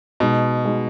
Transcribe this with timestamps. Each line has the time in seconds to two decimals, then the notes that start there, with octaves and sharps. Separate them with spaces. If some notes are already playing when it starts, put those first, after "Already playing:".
0.20 B2 G#3 D#4 F#4
0.65 G#3 D#4 F#4